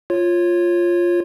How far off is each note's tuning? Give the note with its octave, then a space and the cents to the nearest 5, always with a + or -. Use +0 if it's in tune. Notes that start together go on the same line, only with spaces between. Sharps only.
F4 +0 C#5 -15